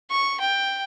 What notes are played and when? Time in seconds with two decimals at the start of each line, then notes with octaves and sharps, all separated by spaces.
0.10 C#6
0.40 G5